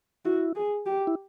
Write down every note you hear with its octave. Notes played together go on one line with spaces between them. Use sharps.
E4 F#4
G#4
G4
E4